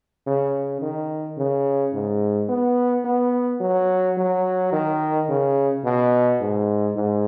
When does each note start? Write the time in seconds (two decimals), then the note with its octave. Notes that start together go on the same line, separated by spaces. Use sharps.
0.27 C#3
0.82 D#3
1.37 C#3
1.93 G#2
2.49 B3
3.05 B3
3.61 F#3
4.17 F#3
4.72 D#3
5.29 C#3
5.85 B2
6.40 G#2
6.96 G#2